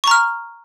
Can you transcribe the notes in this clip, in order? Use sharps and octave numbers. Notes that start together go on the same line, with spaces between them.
A#5 C#6 F6